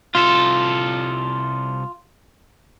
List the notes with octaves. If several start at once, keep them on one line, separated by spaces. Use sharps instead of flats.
C2 F4 A4